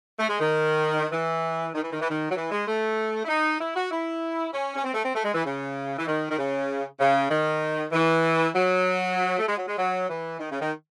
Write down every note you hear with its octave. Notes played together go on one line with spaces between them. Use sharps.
A3
G#3
D#3
E3
D#3
E3
D#3
E3
D#3
F#3
E3
G#3
A3
E4
D#4
E4
F#4
E4
C#4
C#4
C4
A3
C4
A3
G#3
E3
C#3
E3
D#3
D#3
C#3
C#3
D#3
E3
F#3
A3
G#3
F#3
G#3
F#3
E3
D#3
C#3
D#3